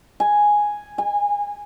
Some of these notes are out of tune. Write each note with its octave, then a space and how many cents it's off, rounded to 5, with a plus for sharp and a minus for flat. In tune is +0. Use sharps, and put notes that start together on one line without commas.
G#5 +0
G#5 -25